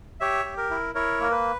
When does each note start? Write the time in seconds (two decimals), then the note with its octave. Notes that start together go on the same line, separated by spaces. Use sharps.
0.20 G4 C#5 E5
0.45 G4
0.57 A#4
0.70 E4
0.95 E4 A#4 C#5
1.20 A#3 A#4
1.31 B4